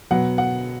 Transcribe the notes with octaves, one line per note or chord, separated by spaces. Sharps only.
B2 F#3 B3 F#5
F#5